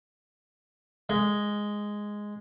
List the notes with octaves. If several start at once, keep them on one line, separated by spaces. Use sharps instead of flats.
G#3